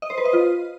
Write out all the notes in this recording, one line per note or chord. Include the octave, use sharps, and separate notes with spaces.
D#5
C5
B4
D#5
F4